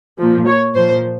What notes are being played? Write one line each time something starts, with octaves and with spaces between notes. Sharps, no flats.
A#2 F3
C#5
A#2 F3 C5